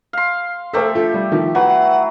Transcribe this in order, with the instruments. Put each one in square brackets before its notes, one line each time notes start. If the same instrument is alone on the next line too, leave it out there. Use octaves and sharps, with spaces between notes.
[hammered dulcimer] F5 C6
[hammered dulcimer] A3 G4 E5 [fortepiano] A4 A#4 C5
[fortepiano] F4 A4
G3
D#3 F3
[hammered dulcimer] E3 F#3 [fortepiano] B4 [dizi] F#5